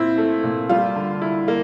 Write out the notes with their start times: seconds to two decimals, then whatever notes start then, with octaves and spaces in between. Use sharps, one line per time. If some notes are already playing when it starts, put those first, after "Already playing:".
Already playing: A#2 C4 E4 F4
0.18 A3
0.43 A#2
0.69 G3 F4
0.96 D3
1.22 E4
1.48 A#3